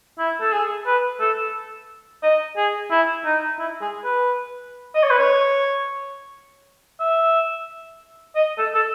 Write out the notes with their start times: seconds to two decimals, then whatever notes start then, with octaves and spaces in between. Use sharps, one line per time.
0.18 E4
0.41 A4
0.52 G#4
0.86 B4
1.21 A4
2.23 D#5
2.56 G#4
2.90 E4
3.25 D#4
3.59 E4
3.81 G#4
4.04 B4
4.95 D#5
5.03 C#5
5.10 B4
5.18 C#5
6.99 E5
8.35 D#5
8.58 A4
8.75 A4